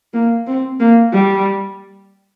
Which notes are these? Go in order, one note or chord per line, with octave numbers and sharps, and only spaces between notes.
A#3
C4
A#3
G3